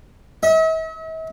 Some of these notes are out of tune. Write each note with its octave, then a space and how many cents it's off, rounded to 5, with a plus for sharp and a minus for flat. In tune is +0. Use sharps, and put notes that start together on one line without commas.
E5 -45